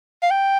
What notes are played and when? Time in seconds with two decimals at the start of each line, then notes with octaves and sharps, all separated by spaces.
0.23 F5
0.30 G5